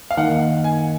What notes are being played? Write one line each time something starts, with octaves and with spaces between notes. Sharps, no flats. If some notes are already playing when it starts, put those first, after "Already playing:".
F5
D#3 A#3 D#4 A#4 D#5 F#5
G#5